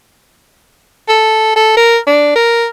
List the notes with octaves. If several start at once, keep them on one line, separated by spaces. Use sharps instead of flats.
A4
A4
A#4
D4
A#4